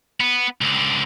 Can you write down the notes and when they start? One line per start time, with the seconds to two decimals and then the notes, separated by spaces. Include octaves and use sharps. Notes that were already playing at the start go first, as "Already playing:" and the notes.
0.20 B3
0.61 C#2 D3